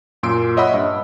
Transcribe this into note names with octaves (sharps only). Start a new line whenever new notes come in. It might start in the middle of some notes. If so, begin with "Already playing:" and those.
F#2 A#2 C6 E6 D7
C#5 D#5 E5 F#5 B5 E6
G2 D#5